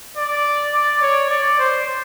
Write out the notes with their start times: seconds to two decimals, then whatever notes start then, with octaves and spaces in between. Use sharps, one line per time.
0.17 D5
0.74 D5
1.02 C#5
1.30 D5
1.59 C5